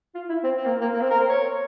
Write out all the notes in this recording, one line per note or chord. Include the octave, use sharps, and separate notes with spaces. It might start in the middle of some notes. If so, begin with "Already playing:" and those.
F4
E4
C4
C4
A#3
A#3
A#3
C4
A#4
C5
C#5